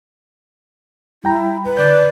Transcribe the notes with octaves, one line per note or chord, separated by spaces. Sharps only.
G3 E4 G5 A#5
B4
D3 D5 G6